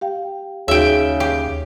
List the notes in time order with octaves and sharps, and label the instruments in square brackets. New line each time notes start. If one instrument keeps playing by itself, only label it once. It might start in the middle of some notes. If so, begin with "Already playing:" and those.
[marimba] G4 F5 G5
[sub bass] D#2 [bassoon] C#3 [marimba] D#4 F#4 G#4 [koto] E5 G5
[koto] G4